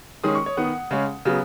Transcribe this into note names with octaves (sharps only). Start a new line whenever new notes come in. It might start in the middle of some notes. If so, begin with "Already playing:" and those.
D#3 G#3 C#4 D#6
C#6
C#5
D#3 B3 F#5
C#3 G#3 C#4
C#3 F#3 B3